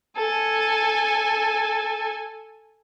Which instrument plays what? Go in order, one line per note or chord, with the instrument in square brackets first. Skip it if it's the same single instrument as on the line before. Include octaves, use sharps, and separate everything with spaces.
[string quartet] A4 G#5